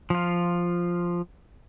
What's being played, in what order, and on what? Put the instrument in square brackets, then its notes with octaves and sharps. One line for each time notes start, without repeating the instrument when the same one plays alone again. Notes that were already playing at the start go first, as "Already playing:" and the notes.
[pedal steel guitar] F3 F4